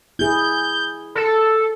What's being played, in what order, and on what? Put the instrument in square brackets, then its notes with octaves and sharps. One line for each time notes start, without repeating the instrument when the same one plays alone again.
[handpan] E4 G#4 [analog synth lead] G6
[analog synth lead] A4